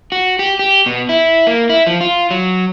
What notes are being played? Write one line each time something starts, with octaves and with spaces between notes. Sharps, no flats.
F#4
G4
G4
B2
E4
A#3
E4
F3
F4
F#3